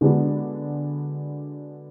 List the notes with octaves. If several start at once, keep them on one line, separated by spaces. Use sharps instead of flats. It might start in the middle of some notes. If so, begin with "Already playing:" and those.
D3 G#3 B3 D4 F#4